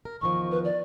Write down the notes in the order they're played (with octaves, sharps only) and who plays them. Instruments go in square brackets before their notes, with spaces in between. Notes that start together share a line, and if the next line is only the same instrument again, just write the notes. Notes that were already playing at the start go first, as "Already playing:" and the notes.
[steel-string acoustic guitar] A#4
[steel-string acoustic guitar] E2 D#3 F3 [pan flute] C#6
[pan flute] B4
D5